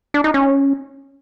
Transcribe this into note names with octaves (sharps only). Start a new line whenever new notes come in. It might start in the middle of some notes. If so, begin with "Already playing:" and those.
D4
D#4
C#4